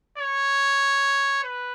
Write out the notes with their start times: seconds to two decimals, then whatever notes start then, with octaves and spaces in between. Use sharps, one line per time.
0.18 C#5
1.44 B4